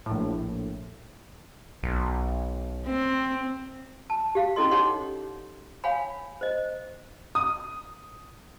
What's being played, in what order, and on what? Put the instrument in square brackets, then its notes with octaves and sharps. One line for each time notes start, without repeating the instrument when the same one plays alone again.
[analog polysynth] A#1 A2
[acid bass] B1
[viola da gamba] C4
[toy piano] A5
G4 F5
C#4 E4 A4 D#5 C6
D#4 G4 C#5 F#5 C6 D6
C#5 F5 F#5 G#5 B5
C5 D#5
[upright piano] D#6